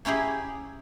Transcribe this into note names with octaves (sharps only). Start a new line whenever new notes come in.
A#3 C#4 E4 G4 G#4